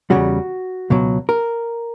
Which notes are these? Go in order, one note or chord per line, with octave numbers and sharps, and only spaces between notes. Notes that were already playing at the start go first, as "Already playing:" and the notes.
E2 C#3 G3 F#4
C#2 B2 F#3
A#4